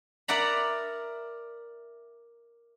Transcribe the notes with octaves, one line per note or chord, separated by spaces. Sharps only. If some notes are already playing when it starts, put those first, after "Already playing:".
A#4 D5 E5 F#5 A#5 B5